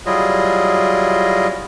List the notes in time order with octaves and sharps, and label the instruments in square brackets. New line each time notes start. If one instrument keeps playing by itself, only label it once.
[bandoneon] F#3 G3 E4 F4 G#4 D#5